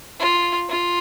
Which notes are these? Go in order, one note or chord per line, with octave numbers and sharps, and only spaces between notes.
F4
F4